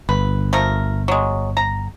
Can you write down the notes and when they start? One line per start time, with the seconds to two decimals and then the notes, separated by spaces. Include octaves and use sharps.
0.09 G1 B4
0.53 F3 A3 A#4
1.08 F#3 G#3
1.57 A#5